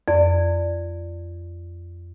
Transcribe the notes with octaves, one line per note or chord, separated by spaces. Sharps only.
F2 D5